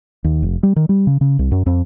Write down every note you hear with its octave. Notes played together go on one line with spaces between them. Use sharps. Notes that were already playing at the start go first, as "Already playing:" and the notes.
D#2
F1
G3
D#3
G3
C#3
C#3
C2
F#2
F2